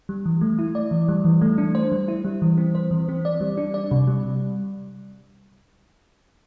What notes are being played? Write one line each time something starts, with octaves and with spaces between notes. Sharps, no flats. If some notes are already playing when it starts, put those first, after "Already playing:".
G3
E3
A3
E4
D5
E3
G3
E3
A3
D4
C5
G3
E4
G3
E3
C4
C5
E3
C4
D5
G3
D4
D5
C3
G3